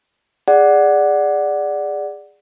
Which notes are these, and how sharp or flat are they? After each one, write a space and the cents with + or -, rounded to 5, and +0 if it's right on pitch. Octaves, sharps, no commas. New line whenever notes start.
G#4 -15 D5 +0 F#5 +0